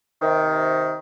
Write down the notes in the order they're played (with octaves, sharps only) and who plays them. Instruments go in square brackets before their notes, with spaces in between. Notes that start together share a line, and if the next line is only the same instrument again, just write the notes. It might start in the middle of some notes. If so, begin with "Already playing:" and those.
[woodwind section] C3 D#3